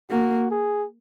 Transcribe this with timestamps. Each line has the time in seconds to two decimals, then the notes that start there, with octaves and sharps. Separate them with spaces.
0.11 A#3 F#4
0.51 G#4